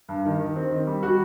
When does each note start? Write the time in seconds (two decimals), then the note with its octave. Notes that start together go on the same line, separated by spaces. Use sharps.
0.09 G2
0.25 D#3
0.40 D#3
0.56 C4
0.71 D#3
0.87 G3
1.03 G3 F#4